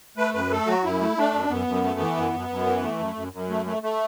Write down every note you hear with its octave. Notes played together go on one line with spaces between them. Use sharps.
A3 B4
F#2 B4
A3 A4
F#3 F#4
F#2 E4
A3
A3 D4
F#2
F#2 B3
F#2
A3
E3
F#2
F#2
F#2
E3
A3
F#2
F#2
F#2
A3
A3
A3